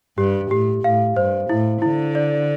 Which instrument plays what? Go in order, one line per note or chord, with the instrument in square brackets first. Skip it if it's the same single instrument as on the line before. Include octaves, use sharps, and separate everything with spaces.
[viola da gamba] G2 [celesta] G4
[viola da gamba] A2 [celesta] G4
[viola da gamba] A2 [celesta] F5
[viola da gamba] G2 [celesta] C5
[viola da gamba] A2 [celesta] E4
[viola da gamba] D3 [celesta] E4
[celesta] D5